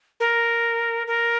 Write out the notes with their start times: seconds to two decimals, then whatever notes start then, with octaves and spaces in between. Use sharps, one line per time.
0.20 A#4
1.07 A#4